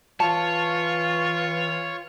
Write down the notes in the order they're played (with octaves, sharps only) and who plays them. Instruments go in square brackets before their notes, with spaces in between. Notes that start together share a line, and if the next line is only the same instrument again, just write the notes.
[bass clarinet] E3 [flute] F4 [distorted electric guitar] C#5 [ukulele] A5